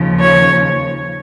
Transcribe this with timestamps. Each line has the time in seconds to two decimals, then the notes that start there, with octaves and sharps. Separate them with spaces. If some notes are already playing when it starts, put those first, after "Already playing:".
Already playing: D#2 C#3 F3
0.19 C#5